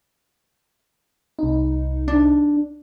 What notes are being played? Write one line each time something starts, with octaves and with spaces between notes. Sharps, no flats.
C2 D#4
D4